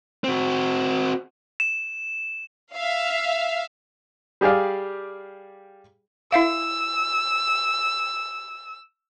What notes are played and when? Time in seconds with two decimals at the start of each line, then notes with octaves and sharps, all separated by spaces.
0.24 C4 F#4
1.60 E7
2.74 E5 F5
4.41 G3 G4 G#4 D5 F5
6.32 E4 E5 F5 E6